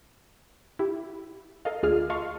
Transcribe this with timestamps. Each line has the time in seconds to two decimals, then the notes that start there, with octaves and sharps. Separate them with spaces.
0.79 E4 G4
1.65 A4 A#4 D#5 F5
1.83 D2 F4 G#4 D5 F6
2.10 D#5 F5 A5 C6 C#6